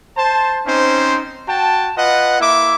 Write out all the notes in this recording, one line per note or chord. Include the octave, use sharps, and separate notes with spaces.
C5 A5
C4 C#4 D#4 C5
F#4 G5 A5
F4 B4 D#5 F#5
A#3 E4 E5 D6